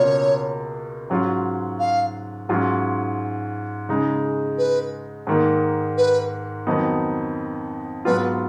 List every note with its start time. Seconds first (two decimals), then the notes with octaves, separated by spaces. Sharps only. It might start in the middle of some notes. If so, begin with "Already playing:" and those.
Already playing: C#2 B2 A#3 F4 C#5
1.10 G#2 F#3 C#4 F4
1.79 F5
2.49 G#2 F#3 C#4 F4
3.89 C#3 G#3 D#4
4.58 B4
5.27 G#2 D#3 A#3
5.97 B4
6.67 F2 D#3 F#3 B3 D#4
8.05 G#2 F#3 B3 F4 B4